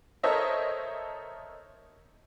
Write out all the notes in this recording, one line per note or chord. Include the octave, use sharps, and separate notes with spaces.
A4 A#4 C5 C#5 D#5 E5